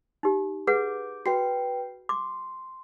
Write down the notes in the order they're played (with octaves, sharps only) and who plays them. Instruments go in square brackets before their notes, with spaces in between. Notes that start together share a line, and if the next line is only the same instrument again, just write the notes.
[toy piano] D#4 G4
[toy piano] G#4 B4 F#5 [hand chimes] D6 G6
[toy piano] F#4 [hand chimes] B4 G5 C7
[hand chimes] C6 [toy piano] D6